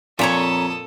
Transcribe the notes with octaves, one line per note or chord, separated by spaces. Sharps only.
F2 A#2 A4 C#5 A#5 B5 D#6